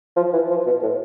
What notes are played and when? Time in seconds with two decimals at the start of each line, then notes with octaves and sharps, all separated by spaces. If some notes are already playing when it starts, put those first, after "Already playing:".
0.16 F3
0.33 E3
0.50 F3
0.66 B2
0.82 A2